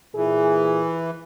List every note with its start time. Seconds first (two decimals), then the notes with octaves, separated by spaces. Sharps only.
0.15 A#2 E3 G#4